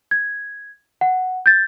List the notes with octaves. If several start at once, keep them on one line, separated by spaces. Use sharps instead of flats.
G#6
F#5
G6 A6